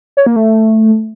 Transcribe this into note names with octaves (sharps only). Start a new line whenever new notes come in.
C#5
A#3
A3